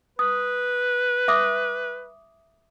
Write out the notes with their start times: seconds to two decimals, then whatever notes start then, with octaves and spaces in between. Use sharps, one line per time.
0.19 B4 D#6
1.28 E5 D6 D#6